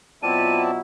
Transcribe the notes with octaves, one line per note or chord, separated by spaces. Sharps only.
B2 F#3 C4 E4 F4 D5 A5 D#7